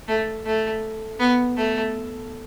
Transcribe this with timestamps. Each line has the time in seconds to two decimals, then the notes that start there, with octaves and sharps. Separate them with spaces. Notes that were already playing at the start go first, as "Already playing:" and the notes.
0.08 A3
0.46 A3
1.20 B3
1.57 A3